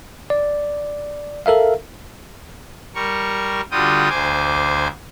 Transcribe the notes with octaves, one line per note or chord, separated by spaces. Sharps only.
D5
A4 A#4 E5 F5
G3 A#4 C#6
D3 G3 F4 F#4 G5 D#6
D2 C5 G#5 D6